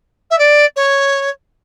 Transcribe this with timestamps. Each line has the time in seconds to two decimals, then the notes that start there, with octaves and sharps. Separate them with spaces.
0.30 E5
0.38 D5
0.76 C#5